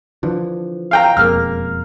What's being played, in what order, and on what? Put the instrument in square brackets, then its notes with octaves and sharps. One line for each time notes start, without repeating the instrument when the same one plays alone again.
[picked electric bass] D3 E3 F3
[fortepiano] F5 G5 A#5
[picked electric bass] E1 F2 G#3 [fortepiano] A#3 F6